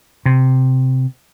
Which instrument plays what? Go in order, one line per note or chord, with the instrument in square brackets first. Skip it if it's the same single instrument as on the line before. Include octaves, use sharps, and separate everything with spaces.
[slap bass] C3